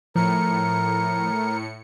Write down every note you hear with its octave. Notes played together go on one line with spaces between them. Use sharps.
A2 F3 A#4 C#7